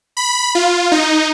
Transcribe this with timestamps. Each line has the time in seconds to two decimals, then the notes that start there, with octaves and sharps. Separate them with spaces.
0.17 B5
0.55 F4
0.92 D#4